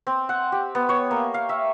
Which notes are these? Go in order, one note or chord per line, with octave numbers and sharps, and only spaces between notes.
C4
F#5
G4
B3
C#5
A#3
F5
E5